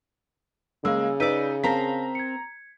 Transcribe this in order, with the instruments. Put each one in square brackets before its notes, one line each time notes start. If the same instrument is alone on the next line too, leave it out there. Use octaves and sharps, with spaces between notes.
[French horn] C#3 [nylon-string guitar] G#3 [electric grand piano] A#3 [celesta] F5 E6
[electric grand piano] D#4 [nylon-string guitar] B4 D5 [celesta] E6 B6 D#7
[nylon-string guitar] C4 A#4 C5 [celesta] F5 A5 A#6 [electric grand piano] A#5 B6
[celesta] G#6 C#7